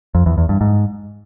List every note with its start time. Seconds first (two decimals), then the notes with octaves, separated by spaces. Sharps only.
0.15 F2
0.26 E2
0.38 E2
0.49 G2
0.61 G#2